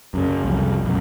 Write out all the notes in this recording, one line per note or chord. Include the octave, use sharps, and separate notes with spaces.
F#2 C#3
C2 F2
B1 F#2